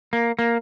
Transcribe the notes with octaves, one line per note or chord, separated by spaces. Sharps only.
A#3
A#3